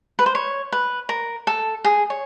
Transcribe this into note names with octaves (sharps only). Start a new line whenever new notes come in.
B4
C5
C#5
B4
A#4
A4
G#4
C#5